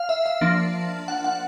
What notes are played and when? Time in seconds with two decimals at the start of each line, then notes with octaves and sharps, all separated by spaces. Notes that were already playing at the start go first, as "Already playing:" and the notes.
Already playing: F5
0.09 E5
0.26 E5
0.41 F3 A#3 D4
1.08 F#5
1.24 F#5